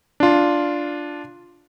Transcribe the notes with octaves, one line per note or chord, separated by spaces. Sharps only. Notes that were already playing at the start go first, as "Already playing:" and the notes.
D4 F4